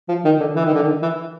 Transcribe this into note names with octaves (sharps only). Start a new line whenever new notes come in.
F3
D#3
D3
E3
D#3
D3
D#3
E3